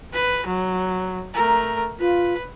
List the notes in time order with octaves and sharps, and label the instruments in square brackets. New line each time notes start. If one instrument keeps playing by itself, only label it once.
[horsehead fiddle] B4
F#3
[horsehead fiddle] A3 A#4 [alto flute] A#5
[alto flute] F4 [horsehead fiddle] B4